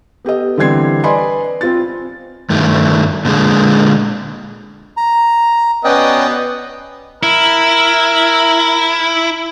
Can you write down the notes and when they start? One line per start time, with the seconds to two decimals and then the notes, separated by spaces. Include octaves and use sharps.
0.25 B3 G4 A4 D#5
0.57 D3 E3 G3 C4 G#6 C7
1.03 B4 D5 D#5 G#5 B5 C6
1.61 C4 F4 A6
2.50 G2 D#3 A3
3.25 A#2 D3 G#3
4.97 A#5
5.85 B3 C#4 D5 D#5 G5
7.23 E4 A#4